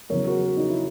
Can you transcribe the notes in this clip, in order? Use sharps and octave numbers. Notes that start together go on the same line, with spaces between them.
E2 C#3 F#3 A#4 C#5
F#4 A#4
D#4
E4